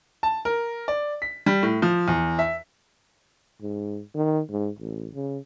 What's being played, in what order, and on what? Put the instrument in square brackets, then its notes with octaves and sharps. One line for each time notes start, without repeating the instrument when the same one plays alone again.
[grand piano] A5
A#4
D5
B6
G3
A2
F3
E2
E5
[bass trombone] G#2
D#3
G#2
A1
C#3